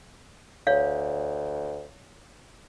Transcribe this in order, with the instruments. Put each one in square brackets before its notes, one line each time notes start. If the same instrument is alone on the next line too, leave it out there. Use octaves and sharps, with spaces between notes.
[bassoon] D2 [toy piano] C#5 F5